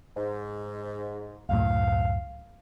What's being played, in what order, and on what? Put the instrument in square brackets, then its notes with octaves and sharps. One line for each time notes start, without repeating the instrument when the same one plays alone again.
[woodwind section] G#2
[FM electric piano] C#2 F#2 A2 [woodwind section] F5